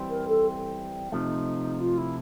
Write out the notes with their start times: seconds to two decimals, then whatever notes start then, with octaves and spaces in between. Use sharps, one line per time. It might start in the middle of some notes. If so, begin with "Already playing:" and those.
Already playing: E3 G3 C4
0.09 A#4
0.28 A4
1.12 C3 F3 A3 D#4
1.80 F4
1.97 E4